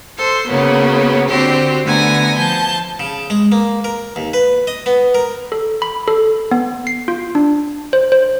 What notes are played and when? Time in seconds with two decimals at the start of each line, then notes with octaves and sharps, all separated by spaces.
0.18 A4 C5 C6
0.48 C#3 F#3 A#3 B3
1.29 D3 C4 F#4 G4 C5
1.84 D3 A3 B3 G#5 A#5 A#6
2.38 F3 A5 G6
3.00 C#3
3.30 G#3
3.52 A#3
3.84 A#4
4.16 D#2
4.34 B4
4.67 D#5
4.86 B3
5.15 A#4
5.52 A4
5.82 B5
6.08 A4
6.51 B3
6.87 C7
7.08 F4
7.35 D4
7.93 C5
8.12 C5